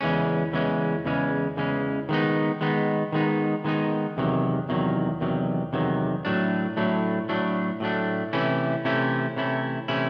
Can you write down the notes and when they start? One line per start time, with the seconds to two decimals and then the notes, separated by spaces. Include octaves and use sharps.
0.01 E2 C#3 E3 G#3 C#4
0.53 E2 C#3 E3 G#3 C#4
1.05 E2 C#3 E3 G#3 C#4
1.57 E2 C#3 E3 G#3 C#4
2.09 D#3 G#3 B3 D#4
2.61 D#3 G#3 B3 D#4
3.12 D#3 G#3 B3 D#4
3.64 D#3 G#3 B3 D#4
4.17 E2 C3 D#3 F#3
4.69 E2 C3 D#3 F#3
5.21 E2 C3 D#3 F#3
5.73 E2 C3 D#3 F#3
6.25 A2 F#3 A3 D4
6.77 A2 F#3 A3 D4
7.29 A2 F#3 A3 D4
7.80 A2 F#3 A3 D4
8.33 C3 E3 A3 C#4 E4
8.85 C3 E3 A3 C#4 E4
9.36 C3 E3 A3 C#4 E4
9.88 C3 E3 A3 C#4 E4